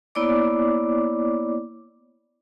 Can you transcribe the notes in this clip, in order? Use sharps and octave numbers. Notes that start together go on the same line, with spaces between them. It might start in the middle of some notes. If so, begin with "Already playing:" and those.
A#3 B3 E4 C#5 D5 D6